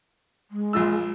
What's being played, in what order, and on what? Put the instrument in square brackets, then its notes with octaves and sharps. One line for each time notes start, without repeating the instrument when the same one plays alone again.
[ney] G#3
[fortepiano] A#1 F4 E6